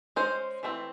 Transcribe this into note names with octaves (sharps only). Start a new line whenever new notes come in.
G#3 C#4 C5
E3 A3 C4